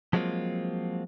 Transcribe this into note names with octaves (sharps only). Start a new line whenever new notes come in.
F3 F#3 G#3 A#3 C4 F4